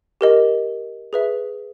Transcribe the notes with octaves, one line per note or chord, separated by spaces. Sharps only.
G4 A#4 D#5
G#4 B4 E5